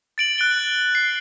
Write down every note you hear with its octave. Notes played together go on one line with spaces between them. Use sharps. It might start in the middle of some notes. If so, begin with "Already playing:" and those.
A6 D7 F#7
F#6 A6 D7 G7
C7